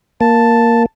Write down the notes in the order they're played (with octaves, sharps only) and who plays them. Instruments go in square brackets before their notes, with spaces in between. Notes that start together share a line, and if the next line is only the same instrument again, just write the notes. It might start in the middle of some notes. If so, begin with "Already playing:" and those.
[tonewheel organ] A#3 [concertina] A5